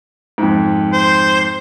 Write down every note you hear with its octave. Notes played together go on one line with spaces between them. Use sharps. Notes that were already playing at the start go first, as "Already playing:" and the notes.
F2 G#2
C5